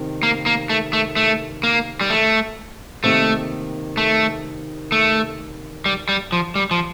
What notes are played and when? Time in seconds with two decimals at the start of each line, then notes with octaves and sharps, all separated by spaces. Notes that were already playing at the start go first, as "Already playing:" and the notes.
Already playing: C3 D#3
0.23 A#3
0.46 A#3
0.70 A3
0.93 A3
1.16 A3
1.63 A#3
2.01 G3
2.10 A3
3.04 C3 D#3 A3 A#3
3.97 A3
4.92 A3
5.85 G3
6.09 G3
6.32 F3
6.56 G3
6.71 F3